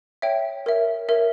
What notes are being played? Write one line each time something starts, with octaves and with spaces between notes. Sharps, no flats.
C#5 E5 G5
A#4 C#5 E5
A#4 C#5 E5